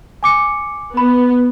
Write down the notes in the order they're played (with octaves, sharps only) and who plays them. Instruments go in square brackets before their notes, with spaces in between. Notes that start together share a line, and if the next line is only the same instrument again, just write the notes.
[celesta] G#5 D6 C#7
[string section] B3 [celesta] B5